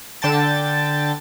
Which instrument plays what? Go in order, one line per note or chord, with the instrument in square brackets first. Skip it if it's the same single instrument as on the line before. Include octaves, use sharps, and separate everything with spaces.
[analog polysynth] D3 G5 A5 A6